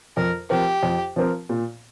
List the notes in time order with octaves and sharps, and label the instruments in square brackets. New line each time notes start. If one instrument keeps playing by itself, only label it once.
[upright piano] F2 [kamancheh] A#4
[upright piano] F3 C4 A#4 [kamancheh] G4
[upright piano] F2
F3 C4 A#4
A#2